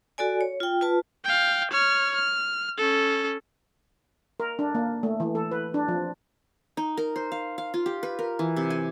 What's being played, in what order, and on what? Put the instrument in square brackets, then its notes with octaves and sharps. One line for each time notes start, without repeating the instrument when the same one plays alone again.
[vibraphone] F#4 A4 D5 G#5
C#5
F4 G5
F4 B4 A5
[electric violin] F5 G5
C#5 F6
F6
C#4 A4
[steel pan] A#4
D4
A#3
A3
E3
A4
B4
D4
F3
[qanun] D#4
A#4
C5
F5
F5
F4
G4
B4
A#4
E3
C3
G#5